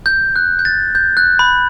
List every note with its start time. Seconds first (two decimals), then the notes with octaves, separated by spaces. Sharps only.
0.06 G6
0.36 F#6
0.59 G6
0.65 A6
0.95 G6
1.17 F#6
1.39 B5